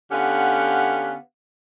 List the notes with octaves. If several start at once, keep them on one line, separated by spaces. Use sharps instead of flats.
D3 B3 C#4 G4 F5 F#5